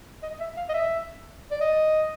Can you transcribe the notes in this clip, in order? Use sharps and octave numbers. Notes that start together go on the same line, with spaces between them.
D#5
E5
F5
D#5
E5
D5
D#5